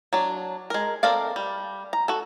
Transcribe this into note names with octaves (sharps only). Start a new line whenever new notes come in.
F#3 D4
G#3 A#4
C4 A4 A#4 D5 F5
G3
A#5
F#4 A4